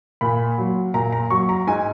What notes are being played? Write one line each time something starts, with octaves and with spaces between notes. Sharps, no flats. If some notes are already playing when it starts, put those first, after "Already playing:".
A#2 B5
F#3
A#2 A#5
A#5
F#3 C#6
A#5
G#2 G#5